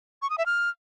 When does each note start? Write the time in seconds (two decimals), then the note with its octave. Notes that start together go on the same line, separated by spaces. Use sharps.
0.22 C#6
0.30 D#6
0.38 E5
0.46 F6